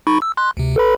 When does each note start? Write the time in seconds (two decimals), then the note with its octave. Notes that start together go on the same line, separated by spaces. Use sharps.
0.07 D#4 B5 C#6
0.22 E6
0.37 C6 F#6
0.57 D2 C3
0.76 A4 B4 B5